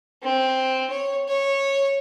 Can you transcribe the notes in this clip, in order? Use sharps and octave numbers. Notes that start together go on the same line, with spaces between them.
C4
C#5
C#5